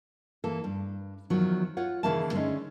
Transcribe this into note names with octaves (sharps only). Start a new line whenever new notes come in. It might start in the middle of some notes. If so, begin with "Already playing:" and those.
E3 A#3 A4
G2
E2 D#3 F3 F#3
F4 C#5 F#5
D#2 C#3 E3 A#3 E4 A5
D3 G#3 A3 C#4 D#4